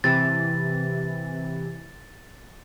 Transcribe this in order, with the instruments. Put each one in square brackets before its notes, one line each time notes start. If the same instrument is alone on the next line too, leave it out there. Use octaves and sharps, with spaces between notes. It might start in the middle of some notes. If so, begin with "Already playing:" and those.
[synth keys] C3 E3 [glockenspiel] A6